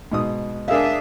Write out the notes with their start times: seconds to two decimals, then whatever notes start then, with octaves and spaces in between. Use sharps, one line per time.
0.12 G#2 B2 D#6
0.68 D4 G#4 A#4 E5 F5